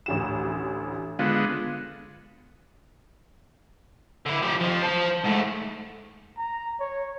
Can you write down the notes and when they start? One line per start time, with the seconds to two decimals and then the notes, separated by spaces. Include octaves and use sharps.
0.06 A1 D2 E7
1.19 D3 G#3 B3 F4
4.26 D3 E4
4.42 F3 G4
4.61 F2 F3
4.83 C5 A5
5.26 G#2 A3
6.38 A#5
6.80 C#5